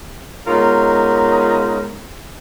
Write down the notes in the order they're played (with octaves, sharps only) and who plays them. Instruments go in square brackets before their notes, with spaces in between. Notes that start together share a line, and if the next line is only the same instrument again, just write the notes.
[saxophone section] G#3 B3 C#4 D#4 F4 A#4